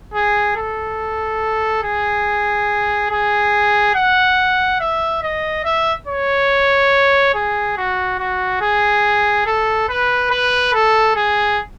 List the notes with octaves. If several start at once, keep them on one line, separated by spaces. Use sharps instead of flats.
G#4
A4
G#4
G#4
F#5
E5
D#5
E5
C#5
G#4
F#4
F#4
G#4
A4
B4
B4
A4
G#4